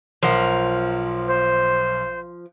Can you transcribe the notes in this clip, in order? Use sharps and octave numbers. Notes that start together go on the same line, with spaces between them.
B1 F3 A#4 F#5
C5